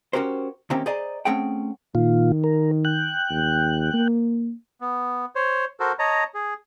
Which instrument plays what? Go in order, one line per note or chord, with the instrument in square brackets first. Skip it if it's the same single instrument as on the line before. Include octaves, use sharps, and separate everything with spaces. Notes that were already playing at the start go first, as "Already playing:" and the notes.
[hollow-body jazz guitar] C#4 F#4 G4 A#4 C5
C3 D#3 A#3 C4 C#4 G4
G#4 C5 D5 D#5 G#5 A#5
A3 C4 C#4 G#4 F#5 G5
[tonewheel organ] A#2 F4 [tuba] D#3
[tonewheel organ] A#4
G5 F#6
[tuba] D#2
A#3
[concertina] B3
C5 C#5
F#4 A4 A#4 C5
C#5 D#5 A5 A#5
G#4